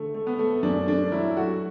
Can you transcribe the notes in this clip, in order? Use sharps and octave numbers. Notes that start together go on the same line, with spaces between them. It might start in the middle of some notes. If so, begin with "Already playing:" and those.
Already playing: D3 A3
A3
B3
A3
F#2 D4
A3 D4
F#3 E4
A3 F#4